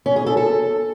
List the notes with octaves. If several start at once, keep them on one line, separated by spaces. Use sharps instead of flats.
C#4
G#4
A4
A4